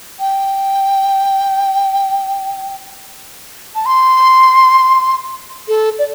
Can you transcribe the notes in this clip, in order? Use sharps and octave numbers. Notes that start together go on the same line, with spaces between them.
G5
A5
C6
A4
D5